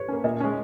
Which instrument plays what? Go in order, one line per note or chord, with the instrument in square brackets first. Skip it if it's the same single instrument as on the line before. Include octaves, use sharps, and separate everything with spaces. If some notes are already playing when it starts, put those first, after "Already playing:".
Already playing: [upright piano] B4 C#5
[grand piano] A#3 C#4
[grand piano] A#2 [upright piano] D#5
[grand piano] G#3 C#4